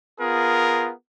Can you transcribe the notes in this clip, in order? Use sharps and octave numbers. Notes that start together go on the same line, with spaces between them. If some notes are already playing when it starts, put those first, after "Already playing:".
B3 F4 G#4 A#4